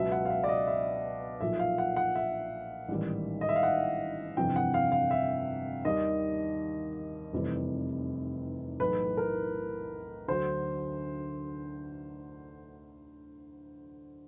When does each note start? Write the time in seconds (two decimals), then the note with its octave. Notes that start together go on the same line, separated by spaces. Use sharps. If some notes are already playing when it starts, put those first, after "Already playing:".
Already playing: C#2 B2 F#3 E5
0.12 F#5
0.25 F5
0.30 E5
0.44 D5
0.49 D#5
0.67 E5
1.41 B1 A#2 F3 E5
1.59 F5
1.78 F#5
1.96 F#5
2.15 E5
2.88 A1 G#2 D#3 G3
3.41 D#5
3.49 E5
3.56 F5
3.63 F#5
4.37 G1 F2 C3 E3 G5
4.56 F#5
4.74 F5
4.92 F5
5.11 E5
5.85 D#2 D#3 G3 D#5
7.33 F1 E2 C3 E3 G3
8.80 B1 A2 E3 B4
9.17 A#4
10.28 D2 D3 F#3 C5